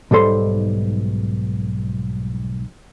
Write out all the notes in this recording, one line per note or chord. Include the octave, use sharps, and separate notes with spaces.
B1 G#2 G3 A4 C6